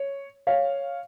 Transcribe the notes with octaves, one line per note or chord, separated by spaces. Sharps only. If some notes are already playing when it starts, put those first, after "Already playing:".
Already playing: C#5
C#5 F5